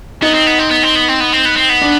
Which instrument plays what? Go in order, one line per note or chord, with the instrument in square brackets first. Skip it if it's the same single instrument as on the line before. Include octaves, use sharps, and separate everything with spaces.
[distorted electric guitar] B3 [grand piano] D#4
[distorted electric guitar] C4
B3
C4
B3
C4
B3
C4
B3
C4
B3
C4
B3
[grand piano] D4